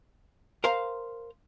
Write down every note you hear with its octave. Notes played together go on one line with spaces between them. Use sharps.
A#4 C5 F5 A#5